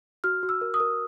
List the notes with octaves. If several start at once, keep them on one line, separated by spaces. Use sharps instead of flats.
F#4 F6
F#4
E6
A#4
D#6
A#4